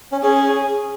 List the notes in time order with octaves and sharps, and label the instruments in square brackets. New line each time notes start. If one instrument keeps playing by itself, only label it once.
[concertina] C#4
[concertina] C#4 [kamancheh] G#4